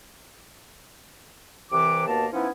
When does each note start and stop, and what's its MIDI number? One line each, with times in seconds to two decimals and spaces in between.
1.71 2.03 36
1.71 2.03 48
1.71 2.03 52
1.71 2.03 86
2.07 2.26 39
2.07 2.26 47
2.07 2.26 58
2.07 2.26 81
2.33 2.48 53
2.33 2.48 59
2.33 2.48 61
2.33 2.48 63
2.33 2.48 64